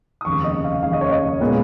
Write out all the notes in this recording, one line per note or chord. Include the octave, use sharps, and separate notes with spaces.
D#6
F1 D#2 C#3 C#6
D#5
F5
F1 D#2 C#3 F5
D#5
C#5
D#5
A#2 G#3 B3